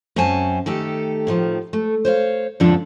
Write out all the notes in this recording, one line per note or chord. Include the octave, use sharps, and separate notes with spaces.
F#2 C4 C#4 C5 G#5 A5
D#3 A3 G4 A4
A2 D#3 F3
A3
C5 C#5 F5
F2 G#2 D3 F3 D4 A4